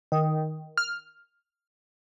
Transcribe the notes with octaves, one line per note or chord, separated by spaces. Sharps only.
D#3
F6